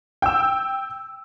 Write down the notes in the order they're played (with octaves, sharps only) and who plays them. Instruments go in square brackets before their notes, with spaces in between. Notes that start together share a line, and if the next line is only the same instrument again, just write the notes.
[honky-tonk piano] G5 E6